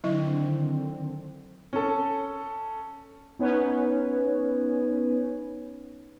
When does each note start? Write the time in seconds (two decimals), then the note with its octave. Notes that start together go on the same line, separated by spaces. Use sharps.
0.04 D3 D#3 F#3 C4 E4 D#5
1.73 C#4 A4
3.39 B3 C#4 D#4 B4 C#5